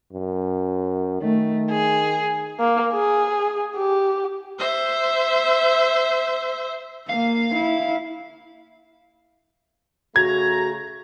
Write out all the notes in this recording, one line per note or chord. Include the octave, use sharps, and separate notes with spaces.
F#2
D#3 A3
G#4
A#3
G#4
G4
C5 E5
A#3 F5
E4
C#3 A3 F#4 A#5 G#6